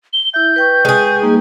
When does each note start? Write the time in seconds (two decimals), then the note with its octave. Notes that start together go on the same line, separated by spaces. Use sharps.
0.13 G7
0.34 E4 E5 G6
0.56 B4 G5 C#6
0.85 G#3 G#4
1.22 G3 A#3 D#4